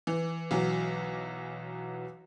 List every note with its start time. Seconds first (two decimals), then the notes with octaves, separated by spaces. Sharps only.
0.07 E3
0.51 B1 E3 F#3